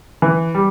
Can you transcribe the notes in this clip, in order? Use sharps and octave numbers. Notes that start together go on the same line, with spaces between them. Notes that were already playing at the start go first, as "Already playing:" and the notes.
E3
G3